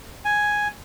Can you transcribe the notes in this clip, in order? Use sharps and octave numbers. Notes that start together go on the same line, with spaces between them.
G#5